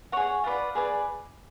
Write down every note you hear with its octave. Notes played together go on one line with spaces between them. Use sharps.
G#4 C#5 F#5
F4 B4 D5 F#5
G#4 B4 D5